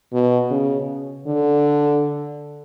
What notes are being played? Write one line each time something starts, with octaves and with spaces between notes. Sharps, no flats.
B2
C#3
D3